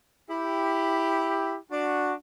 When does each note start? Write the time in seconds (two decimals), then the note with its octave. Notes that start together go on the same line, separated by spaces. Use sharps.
0.29 E4 G4
1.70 D4 F#4